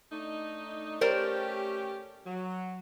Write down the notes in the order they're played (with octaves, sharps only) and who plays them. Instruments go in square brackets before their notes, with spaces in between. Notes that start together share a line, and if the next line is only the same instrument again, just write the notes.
[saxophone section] A3 D4 D#4
[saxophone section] A3 C#4 G4 [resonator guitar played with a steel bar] A#4 C5 D5
[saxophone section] F#3